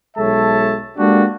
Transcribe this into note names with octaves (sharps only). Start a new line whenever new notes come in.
B1 G#3 A4 C#5 E5 A5
G#3 A#3 D4 F#4 G4 A4